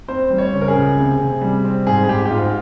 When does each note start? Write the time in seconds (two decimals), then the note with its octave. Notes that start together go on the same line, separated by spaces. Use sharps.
0.08 C4 C5
0.30 G3
0.38 C#5
0.53 C#3
0.61 A#4
0.68 G#4
0.75 C#2
0.97 C3
1.20 C3
1.41 G3
1.64 C4
1.87 G#2 G#4
2.04 G#4
2.08 G#2 G4
2.25 G4
2.30 G#2 F4